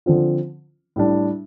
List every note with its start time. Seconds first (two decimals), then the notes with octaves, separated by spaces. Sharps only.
0.06 D3 F3 C4 F4
0.96 A2 G3 D4